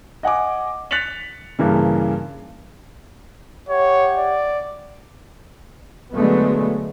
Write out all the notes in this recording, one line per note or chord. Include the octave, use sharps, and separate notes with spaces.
D#5 F#5 G#5 D6
F#6 A6 B6 C#7 F7 F#7
G2 C#3 E3 A#3
G4 C#5 E5 F#5
D5
D3 F#3 G#3 A3 B3